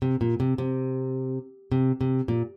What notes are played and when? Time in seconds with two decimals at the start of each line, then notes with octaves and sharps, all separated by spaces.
0.02 C3
0.21 A#2
0.40 C3
0.58 C3
1.72 C3
2.01 C3
2.28 A#2